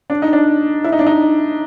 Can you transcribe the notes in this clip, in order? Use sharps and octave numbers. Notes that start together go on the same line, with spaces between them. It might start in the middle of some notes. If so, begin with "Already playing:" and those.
D4
D#4
D4
E4
D#4
D4
D#4